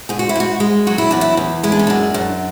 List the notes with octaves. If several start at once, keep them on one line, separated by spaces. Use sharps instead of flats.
G#2 G#4
F#4
E4
G#2 F#4
G#3
F#3 F#4
E4
E2 D4
E4
E2
G#3 E4
D4
C#4
F#2 D4
F#2